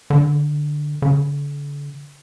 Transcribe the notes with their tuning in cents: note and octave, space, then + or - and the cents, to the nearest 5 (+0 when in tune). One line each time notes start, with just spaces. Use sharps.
D3 +10
D3 -40